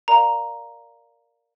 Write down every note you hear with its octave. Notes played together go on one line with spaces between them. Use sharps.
A#4 D5 F5 A#5